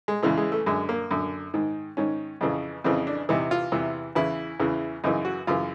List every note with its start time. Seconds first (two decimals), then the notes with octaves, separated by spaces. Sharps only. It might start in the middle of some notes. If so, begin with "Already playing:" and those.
0.08 G#3
0.23 E2 C#3 E3 G#3
0.37 G#3
0.52 A3
0.66 F#2 D3 G#3
0.89 A#3
1.11 F#2 D3
1.54 G#2 D#3
1.97 G#2 D#3 C#4
2.41 F2 C#3 E3
2.84 F2 C#3 E3 C4
3.07 D4
3.29 E2 C3 E3 D#4
3.51 F4
3.72 E2 C3 E3
4.15 E2 C#3 E3 E4
4.60 E2 C#3 E3
5.04 F#2 C#3 E3 D#4
5.25 F#4
5.47 F#2 C#3 E3 F4